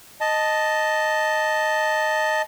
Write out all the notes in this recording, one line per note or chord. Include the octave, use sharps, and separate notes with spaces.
D#5 A5